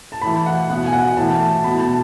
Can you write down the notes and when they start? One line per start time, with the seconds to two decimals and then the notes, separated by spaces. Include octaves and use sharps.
0.12 A5
0.21 A2 E3 B5
0.46 F#5
0.70 B2 F#5
0.86 G#5
0.92 F#5
1.17 A2 E3 A5
1.40 A5
1.64 B2 B5
1.80 A5